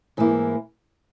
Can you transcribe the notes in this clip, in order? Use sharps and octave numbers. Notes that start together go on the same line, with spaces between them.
G#2 E3 A#3 E4